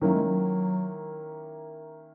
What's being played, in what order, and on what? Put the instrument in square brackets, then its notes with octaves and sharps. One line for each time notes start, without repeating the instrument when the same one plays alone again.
[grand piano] D#3 A#3 C#4 E4 [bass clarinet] F#3
[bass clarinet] G#3
F#3